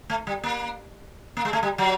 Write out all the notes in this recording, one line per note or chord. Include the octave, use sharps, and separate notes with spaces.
A3
G3
A#3
A#3
G#3
A3
G3
F#3